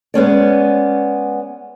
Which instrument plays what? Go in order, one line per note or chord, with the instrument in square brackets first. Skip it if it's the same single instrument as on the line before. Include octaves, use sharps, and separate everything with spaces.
[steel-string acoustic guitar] G#3 B3 C#4 D5